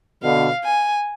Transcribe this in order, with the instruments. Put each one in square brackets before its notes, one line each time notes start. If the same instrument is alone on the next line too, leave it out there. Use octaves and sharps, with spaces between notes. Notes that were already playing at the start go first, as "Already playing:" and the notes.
[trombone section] B2 D3 [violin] F5
[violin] G#5